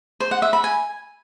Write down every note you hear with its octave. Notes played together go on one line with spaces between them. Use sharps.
C5
F#5
E5
B5
G#5